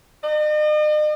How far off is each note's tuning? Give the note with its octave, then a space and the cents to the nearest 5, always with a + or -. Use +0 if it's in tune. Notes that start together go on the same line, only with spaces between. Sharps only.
D#5 -45